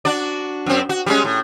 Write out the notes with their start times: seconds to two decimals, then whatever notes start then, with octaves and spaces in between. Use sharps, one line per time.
0.05 D4 F#4 D5
0.66 F#2 C4
0.89 F#4
1.06 G3 G#3 C#4
1.25 A2